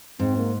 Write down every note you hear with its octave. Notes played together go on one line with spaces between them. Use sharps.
G#2 C4
A#3